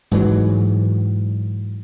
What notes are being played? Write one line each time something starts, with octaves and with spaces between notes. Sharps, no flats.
G#2 E3 F#3